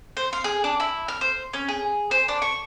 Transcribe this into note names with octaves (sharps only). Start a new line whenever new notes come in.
C5
F5
G#4
D4
E4
F6
C5
C#4
G#4
C5
D4
C#6